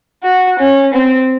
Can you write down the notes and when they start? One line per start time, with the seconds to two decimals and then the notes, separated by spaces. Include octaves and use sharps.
0.23 F#4
0.59 C#4
0.93 C4